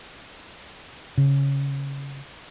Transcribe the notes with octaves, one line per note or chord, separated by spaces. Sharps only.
C#3